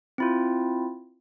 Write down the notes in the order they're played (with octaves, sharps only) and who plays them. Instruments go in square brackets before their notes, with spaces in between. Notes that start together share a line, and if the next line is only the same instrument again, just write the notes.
[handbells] C4 E4 F4